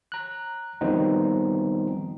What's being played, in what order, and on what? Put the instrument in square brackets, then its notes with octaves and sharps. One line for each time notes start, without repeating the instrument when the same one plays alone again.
[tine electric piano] A#5 F#6
D#3 F3 G3 B3 C4 D#4